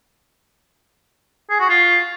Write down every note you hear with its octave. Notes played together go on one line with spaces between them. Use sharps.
G#4
F#4
F4